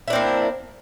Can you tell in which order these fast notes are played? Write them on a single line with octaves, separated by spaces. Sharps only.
E4 D4 C4 A#3